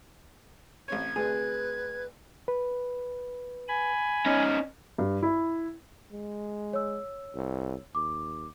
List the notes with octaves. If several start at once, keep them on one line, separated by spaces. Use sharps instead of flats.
A1 C4 C#5 G#6
D2 C3 G#4 B4
B4
G#5 B5
C#4 D#4
G2
E4
G#3
C#5 E6
C2
D#2 D6